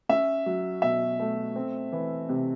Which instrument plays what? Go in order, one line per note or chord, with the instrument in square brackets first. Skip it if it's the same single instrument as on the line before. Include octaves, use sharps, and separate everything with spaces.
[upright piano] C#4 E5
F#3
B2 E5
A3
C4
E3
C3